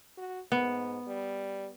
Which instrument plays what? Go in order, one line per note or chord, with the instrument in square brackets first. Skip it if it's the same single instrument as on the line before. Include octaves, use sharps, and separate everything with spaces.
[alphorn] F#4
[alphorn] G#2 [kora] B3
[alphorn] G3